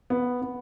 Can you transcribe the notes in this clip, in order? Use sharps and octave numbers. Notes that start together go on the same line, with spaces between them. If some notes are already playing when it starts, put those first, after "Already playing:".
B3
B3